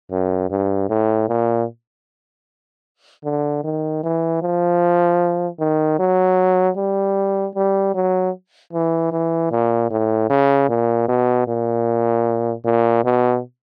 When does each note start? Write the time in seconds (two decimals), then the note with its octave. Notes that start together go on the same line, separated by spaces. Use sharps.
0.11 F#2
0.50 G2
0.89 A2
1.29 A#2
3.25 D3
3.64 D#3
4.04 E3
4.42 F3
5.60 D#3
5.99 F#3
6.77 G3
7.56 G3
7.95 F#3
8.73 E3
9.12 E3
9.51 A#2
9.91 A2
10.30 C#3
10.69 A#2
11.09 B2
11.48 A#2
12.65 A#2
13.04 B2